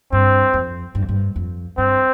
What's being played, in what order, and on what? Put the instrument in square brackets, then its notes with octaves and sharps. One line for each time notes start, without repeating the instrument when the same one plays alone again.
[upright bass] G2 [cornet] C4
[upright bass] F2
G2
F2
G2
F2
[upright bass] G2 [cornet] C4